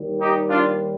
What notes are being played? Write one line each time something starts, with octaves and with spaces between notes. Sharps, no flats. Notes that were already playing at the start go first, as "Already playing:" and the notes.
Already playing: D#2 D#3 G3
D#4 G4
D4 F4